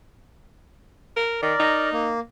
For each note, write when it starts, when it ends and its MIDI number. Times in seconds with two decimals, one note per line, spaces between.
1.17 1.39 70
1.42 1.55 51
1.42 1.89 70
1.42 1.89 74
1.60 2.13 63
1.93 2.20 58